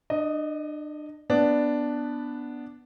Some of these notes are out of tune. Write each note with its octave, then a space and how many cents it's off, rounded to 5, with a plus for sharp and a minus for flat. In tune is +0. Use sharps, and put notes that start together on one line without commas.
D4 +35 D#5 +0
B3 +0 D4 +0 B4 +0